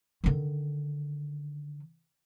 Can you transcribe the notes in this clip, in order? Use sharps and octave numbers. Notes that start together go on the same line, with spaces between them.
D3 D#3